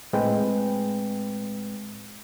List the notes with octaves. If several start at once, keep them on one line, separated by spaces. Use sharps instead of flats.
A2 G#3 C4 B4 G5